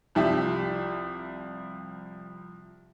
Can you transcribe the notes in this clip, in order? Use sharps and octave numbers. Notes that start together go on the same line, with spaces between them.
C2 F3 G4 E5